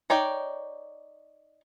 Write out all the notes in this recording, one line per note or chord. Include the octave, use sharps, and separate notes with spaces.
D#4 C#5 D5 G5